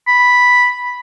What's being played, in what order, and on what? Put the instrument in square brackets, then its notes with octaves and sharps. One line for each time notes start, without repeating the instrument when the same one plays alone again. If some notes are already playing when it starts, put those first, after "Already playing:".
[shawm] B5